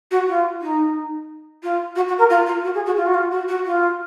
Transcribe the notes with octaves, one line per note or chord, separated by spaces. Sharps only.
F#4
F4
D#4
F4
F#4
F#4
A#4
F4
F4
F#4
G#4
F#4
F4
F#4
F4
F#4
F#4
F4